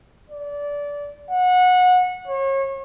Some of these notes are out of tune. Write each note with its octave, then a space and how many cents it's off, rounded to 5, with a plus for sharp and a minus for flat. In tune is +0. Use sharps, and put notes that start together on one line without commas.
D5 -20
F#5 -25
C#5 -35